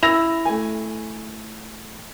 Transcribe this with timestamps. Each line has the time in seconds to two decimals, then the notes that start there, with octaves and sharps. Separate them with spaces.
0.03 E4 E6 A#6 F7
0.45 A3 G#5